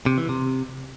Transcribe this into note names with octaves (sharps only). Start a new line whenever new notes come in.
C3
E3
C3